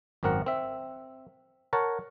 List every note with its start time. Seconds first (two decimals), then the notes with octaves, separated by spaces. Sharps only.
0.23 G#1 F#2 C4 A#4 F#5
0.46 C4 E5
1.73 A#4 C#5 F#5 A5